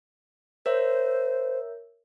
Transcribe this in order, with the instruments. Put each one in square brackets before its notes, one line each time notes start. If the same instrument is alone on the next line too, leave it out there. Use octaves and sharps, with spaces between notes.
[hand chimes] A#4 C#5 E5 [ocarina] C5